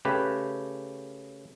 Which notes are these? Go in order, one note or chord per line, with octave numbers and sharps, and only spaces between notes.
C#3 A3 G4 B4